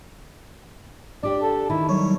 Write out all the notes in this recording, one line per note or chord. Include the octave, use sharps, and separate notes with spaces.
D4 G4 D5
A4
D#3 E4
F#3 G3 C#5